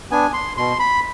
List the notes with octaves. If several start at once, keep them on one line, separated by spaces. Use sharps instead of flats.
B3 D4 G#5
C6
B2 C6
B5